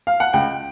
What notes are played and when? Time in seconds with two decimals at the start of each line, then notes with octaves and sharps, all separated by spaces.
0.07 F5
0.20 F#5
0.33 C#2 G5